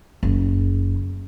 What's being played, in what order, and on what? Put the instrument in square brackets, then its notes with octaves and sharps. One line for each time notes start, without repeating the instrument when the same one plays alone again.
[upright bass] F#1